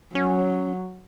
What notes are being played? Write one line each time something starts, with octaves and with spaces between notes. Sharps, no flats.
F#3 C#4